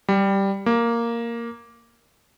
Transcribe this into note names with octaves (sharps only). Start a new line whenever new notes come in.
G3
A#3